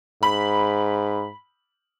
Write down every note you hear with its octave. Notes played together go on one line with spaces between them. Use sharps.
G#2 B5